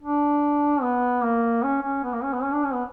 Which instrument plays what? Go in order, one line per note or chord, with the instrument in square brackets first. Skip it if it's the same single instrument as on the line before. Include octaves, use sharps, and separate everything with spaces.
[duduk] D4
B3
A#3
C#4
C#4
B3
A#3
C#4
B3
C#4
D4
C#4
B3